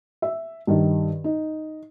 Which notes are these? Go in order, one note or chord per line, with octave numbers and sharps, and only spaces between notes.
E5
G2 D#3
D#4